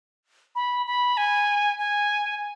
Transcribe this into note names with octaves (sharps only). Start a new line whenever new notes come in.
B5
B5
G#5
G#5